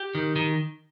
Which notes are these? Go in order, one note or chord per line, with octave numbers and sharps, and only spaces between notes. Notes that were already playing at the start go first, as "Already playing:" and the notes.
Already playing: G4
D#3
D#3